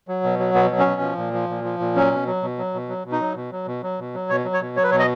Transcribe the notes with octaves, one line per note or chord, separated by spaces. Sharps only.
F#3
B2
F#3
B2 B3
F#3
C#4
B2
F3
A#2
F3
A#2
F3
A#2
F#3 C#4
B2
F#3
B2
F#3
B2
F#3
B2
D#4
F#3
B2
F#3
B2
F#3
B2
F#3
B2 C#5
F#3
C#5
B2
F#3 C#5
B4
B2 C#5
D#5